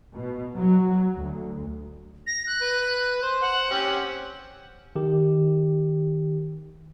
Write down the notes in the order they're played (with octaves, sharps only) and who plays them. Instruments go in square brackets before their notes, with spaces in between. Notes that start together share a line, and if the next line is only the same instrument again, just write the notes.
[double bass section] B2
F#3
D2
[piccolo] A#6
F#6
[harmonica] B4
C5 C6
[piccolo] F#5
[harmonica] C4 C#4 G4
[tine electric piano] D#3 G4